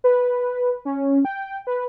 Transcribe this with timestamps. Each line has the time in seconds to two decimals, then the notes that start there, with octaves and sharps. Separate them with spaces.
0.04 B4
0.85 C#4
1.25 G5
1.67 B4